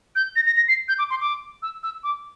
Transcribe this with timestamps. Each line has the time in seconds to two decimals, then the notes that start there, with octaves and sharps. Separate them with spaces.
0.16 G6
0.36 A#6
0.46 A#6
0.57 A#6
0.68 C7
0.88 G6
0.99 D6
1.10 C6
1.20 D6
1.62 E6
1.83 E6
2.04 D6